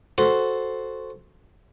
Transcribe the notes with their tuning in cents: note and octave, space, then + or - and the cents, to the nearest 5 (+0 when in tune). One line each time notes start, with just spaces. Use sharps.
F#4 +0 A4 +0 C5 +0